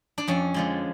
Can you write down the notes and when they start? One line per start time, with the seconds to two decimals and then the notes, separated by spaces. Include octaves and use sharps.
0.18 D4
0.27 F2 C#4
0.54 D3 F3 G#3